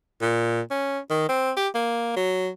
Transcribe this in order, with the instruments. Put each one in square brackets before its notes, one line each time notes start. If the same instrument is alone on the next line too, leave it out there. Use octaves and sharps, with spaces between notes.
[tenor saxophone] A#2
C#4
D#3
C4
G4
A#3
F#3